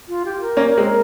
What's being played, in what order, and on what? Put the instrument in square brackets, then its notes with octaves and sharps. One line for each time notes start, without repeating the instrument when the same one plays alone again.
[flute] F4
G4
A#4
[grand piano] A#3 C#4
G#3 C4